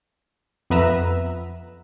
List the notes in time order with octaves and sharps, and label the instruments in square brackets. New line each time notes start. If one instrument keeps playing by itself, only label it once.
[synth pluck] F2 B3 B4 E5 A#5 E6